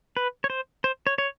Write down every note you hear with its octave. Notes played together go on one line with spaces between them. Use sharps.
B4
C#5
C5
C5
C#5
C#5